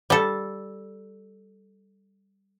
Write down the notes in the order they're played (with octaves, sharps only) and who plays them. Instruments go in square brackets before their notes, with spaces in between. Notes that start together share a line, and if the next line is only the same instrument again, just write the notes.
[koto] G3 A4